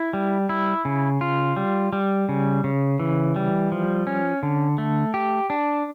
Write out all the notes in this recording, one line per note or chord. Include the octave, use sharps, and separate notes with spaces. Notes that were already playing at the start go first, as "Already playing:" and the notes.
Already playing: E4
G3
E4
C#3
F4
G3
G3
C#3
C#3
E3
G3
F3
C#4
D3
A3
G4
D4